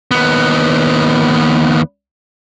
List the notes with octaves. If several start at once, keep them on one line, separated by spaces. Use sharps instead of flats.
D#2 B3